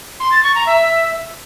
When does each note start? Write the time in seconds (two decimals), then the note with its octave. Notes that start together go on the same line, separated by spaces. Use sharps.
0.20 C6
0.32 A6
0.43 C#6
0.55 A#5
0.67 E5